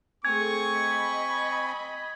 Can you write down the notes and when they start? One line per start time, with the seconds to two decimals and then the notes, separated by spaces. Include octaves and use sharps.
0.25 A3 C4 G#4 G#5 C#6 G#6
0.73 D#5 B5